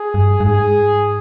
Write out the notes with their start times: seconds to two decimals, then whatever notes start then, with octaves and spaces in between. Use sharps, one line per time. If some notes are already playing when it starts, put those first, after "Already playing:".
Already playing: G#4
0.14 G2
0.40 G2
0.45 G#2 G#4